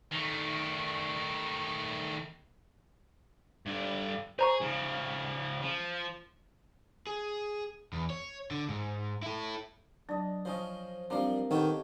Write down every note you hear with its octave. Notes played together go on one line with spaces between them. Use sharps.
D#3 A3
G2 D3
G#4 C5 A#5 C#6
C#3 F3
F3
G#4
E2
C#5
D3
G#2
E4 A4
F#3 D4 D#5
F3 C#4 F4 C5 D#5
F3 G3 A#3 C4 D4 A#4 F5 D#6
D#3 B3 G4 A4 C#5